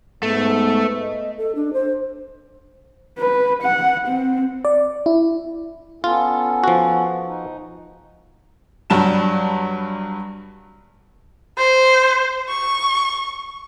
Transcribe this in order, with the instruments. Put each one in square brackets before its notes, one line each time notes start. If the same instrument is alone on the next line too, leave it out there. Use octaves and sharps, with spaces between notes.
[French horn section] G#2 B3 [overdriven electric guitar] A3
[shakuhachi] D#5
A4
D4
C5
[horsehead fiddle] B4
F#5
C4
[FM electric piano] D5
E4
[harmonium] B3 C#4 A4 [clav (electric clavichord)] F4
[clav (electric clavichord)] F3 F#4
[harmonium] D#4
[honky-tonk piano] G2 F#3 G3 A5 E7
[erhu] C5
C#6